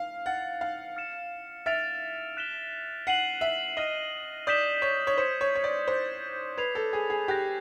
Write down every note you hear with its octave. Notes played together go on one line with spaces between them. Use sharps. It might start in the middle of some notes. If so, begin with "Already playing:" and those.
Already playing: F5
F#5 F6 A6 C#7
F5
F6 A6 C#7 E7
E5 F6 A6 D7 F7
F#6 B6 E7 G7
F#5 A6 C7 D#7 F#7
E5
D#5 F6 A#6 D#7 G7
D5 D#6 G6 B6 E7 G7
C#5
C#5
C5 G#6 C#7 E7 G7
C#5
C#5
D5
C5 D6 F#6 A6
B4 G#6 C7 F7
A4
G#4
G#4
G4 C#6 F#6 A#6